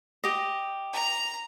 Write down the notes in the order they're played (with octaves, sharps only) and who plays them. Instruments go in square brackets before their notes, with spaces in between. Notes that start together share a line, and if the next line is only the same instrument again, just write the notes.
[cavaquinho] G4 D#5
[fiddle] A#5